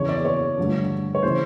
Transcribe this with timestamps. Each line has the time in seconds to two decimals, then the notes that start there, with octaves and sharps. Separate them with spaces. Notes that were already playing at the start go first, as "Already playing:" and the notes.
Already playing: E2 C#3 E3 C#5
0.09 D5
0.25 C#5
0.57 G2 D3 F3 A3
1.15 C#5
1.23 C#3 E3 C5